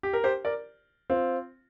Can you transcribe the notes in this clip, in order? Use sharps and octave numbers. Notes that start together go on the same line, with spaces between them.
G4
A#4
G4 C5
A#4 D5
C4 F4